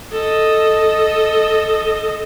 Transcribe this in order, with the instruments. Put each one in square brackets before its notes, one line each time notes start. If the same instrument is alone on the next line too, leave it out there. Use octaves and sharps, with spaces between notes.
[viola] A4 D#5